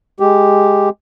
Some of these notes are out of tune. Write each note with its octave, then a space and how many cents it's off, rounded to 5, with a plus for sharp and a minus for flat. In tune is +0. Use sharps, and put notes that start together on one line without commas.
G#3 +0 G4 +0